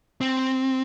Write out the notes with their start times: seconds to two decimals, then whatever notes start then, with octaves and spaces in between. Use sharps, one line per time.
0.21 C4